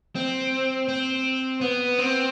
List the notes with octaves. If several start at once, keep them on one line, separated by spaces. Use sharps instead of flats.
C4
C4
B3
C4